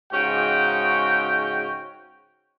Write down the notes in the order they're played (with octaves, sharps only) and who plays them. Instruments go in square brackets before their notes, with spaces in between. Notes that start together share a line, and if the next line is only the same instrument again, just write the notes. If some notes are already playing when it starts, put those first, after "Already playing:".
[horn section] G#2 C#3 C#4 F#4 G5